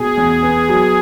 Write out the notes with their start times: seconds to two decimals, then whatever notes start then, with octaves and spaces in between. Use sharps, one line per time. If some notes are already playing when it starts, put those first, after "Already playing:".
Already playing: B2 G#4
0.17 E2
0.43 B3
0.69 F#3